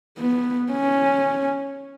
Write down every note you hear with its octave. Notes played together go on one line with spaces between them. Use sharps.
B3
C#4